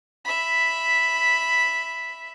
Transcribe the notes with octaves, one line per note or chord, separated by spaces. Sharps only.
E5 B5